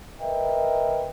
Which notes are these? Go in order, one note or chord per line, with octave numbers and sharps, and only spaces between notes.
A#4 B4 D#5 E5 G5